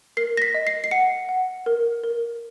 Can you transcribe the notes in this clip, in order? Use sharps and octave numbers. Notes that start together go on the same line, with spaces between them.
A#4 C7
A#6
B6
D#5
C7
C7
F#5 C#7
F#5
A#4
A#4